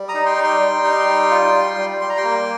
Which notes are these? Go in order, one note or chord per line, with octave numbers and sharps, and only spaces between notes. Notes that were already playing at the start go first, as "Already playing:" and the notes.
Already playing: G3
A#5 D#6
D#4
G5 C6
G3
G5 C6
G3
D#4
G3
F4
G3
G3
G3 C6
A#5
G5 C6
A#3